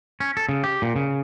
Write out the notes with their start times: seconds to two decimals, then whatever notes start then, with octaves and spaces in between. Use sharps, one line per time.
0.20 C#4
0.37 A4
0.49 C#3
0.64 G4
0.82 A#2
0.96 C#3